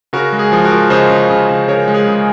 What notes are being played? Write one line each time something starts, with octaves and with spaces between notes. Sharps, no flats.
C#3 F#4 A#4
G#3
G#4
F3
F#4 A#4
F3
C#3 C5 D#5
C#3
C#3
C#3
C#3 A#4 C#5
G#3
G#4
C#3